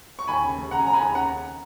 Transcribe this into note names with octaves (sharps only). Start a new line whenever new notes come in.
C#6
D#2 G#5 B5
C#3
F1
C#3 F#5 A#5
G#5
F1 A#5
G#5 B5
D#2
C#3 F#5 A#5